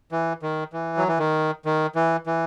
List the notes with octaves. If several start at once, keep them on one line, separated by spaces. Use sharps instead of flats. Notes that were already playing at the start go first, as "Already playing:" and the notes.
E3
D#3
E3
F#3
E3
D#3
D#3
E3
E3